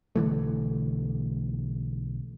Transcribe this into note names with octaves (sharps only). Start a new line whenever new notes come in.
B1 D3 E3 A3